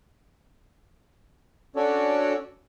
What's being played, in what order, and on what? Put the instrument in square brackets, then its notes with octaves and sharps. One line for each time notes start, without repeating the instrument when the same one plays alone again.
[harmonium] C#4 D4 F#4 A4 C#5 D5